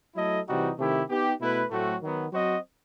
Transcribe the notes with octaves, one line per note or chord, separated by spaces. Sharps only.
F#3 A3 E4 A4 D#5
C3 E3 G3 D#4 F#4
C3 D#3 A3 E4 G4
B3 D#4 G4
B2 A3 E4 B4
A2 F#3 A3 C4 F#4
D#3 F#3 B3
F#3 C4 F#4 C5 D#5